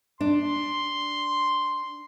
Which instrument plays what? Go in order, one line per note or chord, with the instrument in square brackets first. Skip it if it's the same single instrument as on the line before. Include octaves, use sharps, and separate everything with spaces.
[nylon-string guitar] D4 [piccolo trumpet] C6